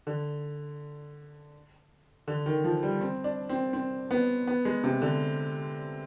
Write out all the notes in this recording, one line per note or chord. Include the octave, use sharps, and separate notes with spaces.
D3
D3
D#3
F3
G3
C4
D4
C4
C4
B3
B3
G#3
C3
D3